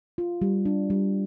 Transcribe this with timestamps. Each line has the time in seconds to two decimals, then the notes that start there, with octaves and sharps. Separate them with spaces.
0.18 F4
0.42 G3
0.66 D4
0.90 G3